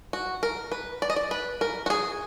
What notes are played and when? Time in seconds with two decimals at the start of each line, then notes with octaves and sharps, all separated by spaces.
0.13 F#4
0.43 A#4
0.72 B4
1.02 D5
1.10 D#5
1.16 D5
1.31 B4
1.61 A#4
1.86 F#4
1.90 G#4